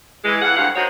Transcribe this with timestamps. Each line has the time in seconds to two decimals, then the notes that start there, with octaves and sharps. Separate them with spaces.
0.25 E3 G#3
0.42 F2 E3 F5 F#5
0.57 D2 G2 G4 F5 F#5
0.76 D#3 G#3 D#4 F#4 C5 C#5